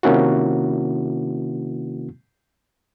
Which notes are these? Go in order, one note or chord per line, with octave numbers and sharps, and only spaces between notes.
C3 D#3 A#3 C#4 E4 F#4